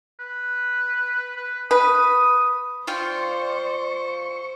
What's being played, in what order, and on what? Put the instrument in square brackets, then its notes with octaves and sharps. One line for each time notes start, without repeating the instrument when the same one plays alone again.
[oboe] B4
B4
[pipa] B4 [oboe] D#6
[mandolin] F4 F5 G5 [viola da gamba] C5 [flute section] D5 C6 [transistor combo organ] C#6